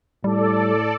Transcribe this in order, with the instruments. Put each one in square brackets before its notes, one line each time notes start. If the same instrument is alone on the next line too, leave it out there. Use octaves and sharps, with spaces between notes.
[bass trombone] A2 [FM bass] G3 [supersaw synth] A4 D5